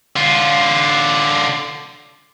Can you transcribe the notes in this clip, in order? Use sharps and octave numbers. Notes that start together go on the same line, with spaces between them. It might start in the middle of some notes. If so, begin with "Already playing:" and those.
D3 F4